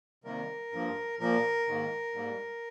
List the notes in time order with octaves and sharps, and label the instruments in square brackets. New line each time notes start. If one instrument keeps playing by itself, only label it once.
[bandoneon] C3 D#3 G3 A#3 A#4
G2 F3 A#3
A#2 F3 A#3 A#4
G#2 D#3 A#3
G#2 G3 A#3